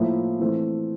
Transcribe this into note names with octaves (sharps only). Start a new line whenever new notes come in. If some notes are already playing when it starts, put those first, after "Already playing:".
Already playing: A2 F3 A#3 E4
E3 A3 C4